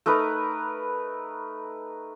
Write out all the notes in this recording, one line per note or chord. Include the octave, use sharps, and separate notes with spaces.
A3 D#4 A#4 B4